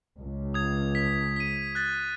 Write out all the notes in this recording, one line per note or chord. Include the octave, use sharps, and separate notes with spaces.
C#2
D#6 G#6
B6
B6 D#7
F#6 A6